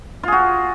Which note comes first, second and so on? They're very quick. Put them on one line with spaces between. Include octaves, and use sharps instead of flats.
F4 G#4 F#4